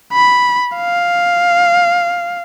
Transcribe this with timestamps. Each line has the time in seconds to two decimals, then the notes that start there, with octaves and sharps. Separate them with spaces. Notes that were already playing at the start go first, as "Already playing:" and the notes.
0.13 B5
0.76 F5